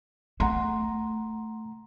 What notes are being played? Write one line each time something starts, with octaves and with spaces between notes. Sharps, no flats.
A3 F#5 A#5 C6